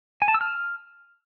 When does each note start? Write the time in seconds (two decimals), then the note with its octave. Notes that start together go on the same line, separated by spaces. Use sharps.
0.22 G#5
0.28 A5
0.34 E6
0.41 F6